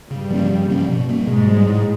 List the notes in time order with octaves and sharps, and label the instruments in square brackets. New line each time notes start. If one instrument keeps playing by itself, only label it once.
[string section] G2 G3 [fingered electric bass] C#3
[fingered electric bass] F3 A#3 C#4
C#3
F3 A#3 C#4
B2
G3 A#3
[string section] G#2 G#3 [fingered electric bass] B2
[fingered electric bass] G3 A#3
A2